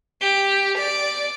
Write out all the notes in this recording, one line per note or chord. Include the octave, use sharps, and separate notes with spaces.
G4
D5